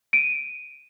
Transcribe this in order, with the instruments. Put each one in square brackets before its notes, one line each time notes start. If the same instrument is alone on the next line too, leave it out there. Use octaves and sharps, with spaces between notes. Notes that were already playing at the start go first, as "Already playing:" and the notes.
[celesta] D7 D#7